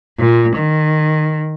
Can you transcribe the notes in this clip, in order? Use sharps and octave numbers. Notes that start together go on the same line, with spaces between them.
A#2
D#3